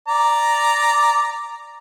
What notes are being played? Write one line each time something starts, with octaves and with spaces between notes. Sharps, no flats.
D5 A#5